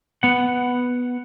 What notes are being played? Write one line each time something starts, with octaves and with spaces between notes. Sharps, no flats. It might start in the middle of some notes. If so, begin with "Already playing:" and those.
B3 F#5